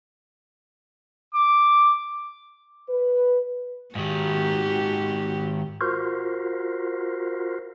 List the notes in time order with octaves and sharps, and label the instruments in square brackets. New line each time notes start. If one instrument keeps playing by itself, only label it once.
[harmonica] D6
[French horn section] B4
[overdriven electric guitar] G#2 D#3 [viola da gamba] F#4 G4
[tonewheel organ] F4 F#4 A#4 C5